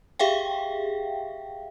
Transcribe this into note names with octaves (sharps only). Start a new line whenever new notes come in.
G4 G#4 E5 F5 G5